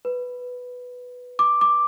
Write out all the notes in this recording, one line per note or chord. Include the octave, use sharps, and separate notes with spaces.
B4
D6
D6